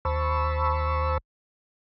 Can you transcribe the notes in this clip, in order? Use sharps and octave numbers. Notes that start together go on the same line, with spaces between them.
D#2 C5 A5 B5 C#6 E6